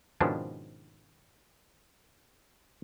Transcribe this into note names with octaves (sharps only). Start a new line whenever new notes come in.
G#2 B2 D#3 F3 C#4 D4